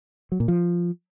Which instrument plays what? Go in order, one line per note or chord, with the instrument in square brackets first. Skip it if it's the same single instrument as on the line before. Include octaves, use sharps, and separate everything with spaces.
[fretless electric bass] F#3
A#2
F3